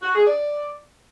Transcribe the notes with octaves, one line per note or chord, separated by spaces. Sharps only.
F#4
G#4
D5